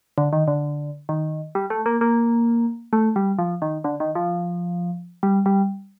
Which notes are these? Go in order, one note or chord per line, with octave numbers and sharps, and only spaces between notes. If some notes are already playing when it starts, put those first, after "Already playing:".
D3
D#3
D3
D#3
G3
A3
A#3
A#3
A3
G3
F3
D#3
D3
D#3
F3
G3
G3